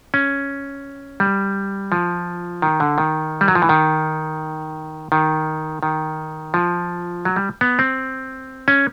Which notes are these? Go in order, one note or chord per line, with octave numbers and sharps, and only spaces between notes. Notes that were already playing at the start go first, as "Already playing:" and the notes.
C#4
G3
F3
D#3
D3
D#3
G3
F#3
F3
E3
D#3
D#3
D#3
F3
F#3
G3
B3
C4
C#4